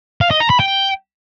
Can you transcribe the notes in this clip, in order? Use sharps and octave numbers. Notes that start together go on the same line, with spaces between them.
F5
D#5
A#5
B5
G5